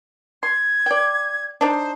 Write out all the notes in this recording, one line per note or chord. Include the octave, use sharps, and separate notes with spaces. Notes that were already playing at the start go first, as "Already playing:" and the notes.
C6 G#6
D5 G5
D4 D#4 C5